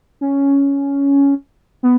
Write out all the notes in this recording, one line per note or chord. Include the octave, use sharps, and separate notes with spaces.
C#4
B3